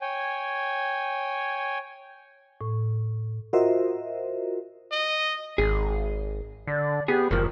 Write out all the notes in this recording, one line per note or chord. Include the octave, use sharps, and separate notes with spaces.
C#5 G5 G#5
A2
F4 F#4 A#4 C5 D#5 E5
D#5
G#1 G#4
D3 D5
B3 G4 G#4
F#1 A2 D#3 F3 A#4